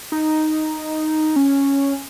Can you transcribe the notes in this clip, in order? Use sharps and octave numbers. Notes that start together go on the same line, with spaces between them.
D#4
C#4